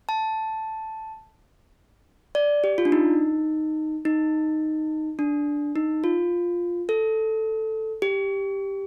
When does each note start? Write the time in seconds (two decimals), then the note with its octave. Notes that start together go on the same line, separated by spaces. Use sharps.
0.09 A5
2.35 D5
2.64 G4
2.78 F4
2.85 D4
2.92 D#4
4.05 D#4
5.19 D4
5.76 D#4
6.04 F4
6.89 A4
8.02 G4